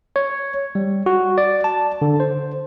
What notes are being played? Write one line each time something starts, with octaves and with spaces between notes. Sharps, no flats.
C#5
G3
F#4
D5
A5
D3
C5